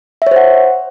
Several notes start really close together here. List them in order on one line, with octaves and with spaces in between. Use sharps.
E5 C#5 C5 F#5